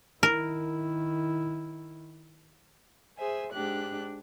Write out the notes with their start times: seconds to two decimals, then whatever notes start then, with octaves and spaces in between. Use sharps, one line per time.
0.23 D#3 E4 A#4
3.18 G#4 C5 E5 G#5
3.53 G#2 D4 G4 F#6